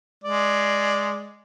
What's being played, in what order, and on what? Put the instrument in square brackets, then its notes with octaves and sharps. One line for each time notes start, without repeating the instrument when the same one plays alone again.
[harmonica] G#3 D5